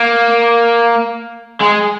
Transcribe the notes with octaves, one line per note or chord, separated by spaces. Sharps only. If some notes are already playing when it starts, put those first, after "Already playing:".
Already playing: A#3
G#3